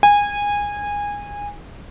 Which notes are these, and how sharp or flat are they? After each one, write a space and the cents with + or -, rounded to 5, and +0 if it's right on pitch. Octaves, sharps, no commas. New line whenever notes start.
G#5 -20